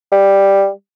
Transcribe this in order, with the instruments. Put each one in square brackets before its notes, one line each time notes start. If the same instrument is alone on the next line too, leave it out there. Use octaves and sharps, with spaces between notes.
[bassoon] G3